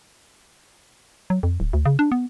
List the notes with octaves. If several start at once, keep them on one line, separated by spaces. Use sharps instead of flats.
F#3
F2
D1
D2
C#3
D4
B3